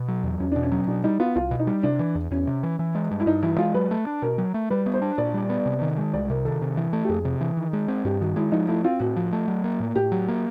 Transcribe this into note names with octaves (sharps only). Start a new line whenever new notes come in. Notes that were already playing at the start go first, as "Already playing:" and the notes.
Already playing: B2
F#3
E2
E2 C#4
B2 D4
C#4
F#3
B2 D4
G3 D#4
B3 F4
C2 F4
B2
D#4
G3
C3 D4
E3
E2
E2 C#4
C3
E3
E3
G#3
G2
E4
G2 D#4
E3 E4
G#3 F4
F#3 B4
A3
D4
B2 A#4
F#3
A3
G3 B4
B3
C5
D4
A#2 D5
G3
B3
C3
D#3
G#3
C2 D5
C3 A#4
D#3 A4
C3
E3
A3
G4
F2 G#4
C3
E3
D#3
G#3
C4
G2 G4
D#3 F#4
G#3 E4
F3 D#4
A3 E4
C4 F4
A2 F#4
F3
A3
F#3
A#3
A2
A2 G4
F#3
A#3